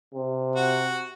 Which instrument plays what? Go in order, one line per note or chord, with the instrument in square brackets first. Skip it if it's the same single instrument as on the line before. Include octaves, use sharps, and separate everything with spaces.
[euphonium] C3
[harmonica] F#4